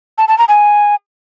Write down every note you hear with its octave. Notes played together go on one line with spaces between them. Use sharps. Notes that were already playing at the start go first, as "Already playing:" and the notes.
A5
A5
A#5
G#5